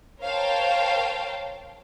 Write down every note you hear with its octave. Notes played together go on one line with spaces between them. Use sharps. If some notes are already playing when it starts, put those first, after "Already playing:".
A#4 C5 C#5 F5 G5 A5